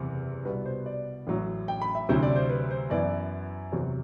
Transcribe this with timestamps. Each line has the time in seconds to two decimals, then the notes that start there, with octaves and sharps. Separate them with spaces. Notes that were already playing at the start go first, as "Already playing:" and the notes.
Already playing: F#1 E2 C3
0.45 C2 B2 G3 B3 B4
0.66 C5
0.86 D5
1.27 A1 A2 F#3
1.68 G5
1.82 B5
1.95 E5
2.09 D2 C3 F#3 C4 E4 C5
2.23 D5
2.36 C5
2.50 B4
2.71 C5
2.90 F#2 E3 B3 E4 D5
3.72 E2 C3 F#3 C5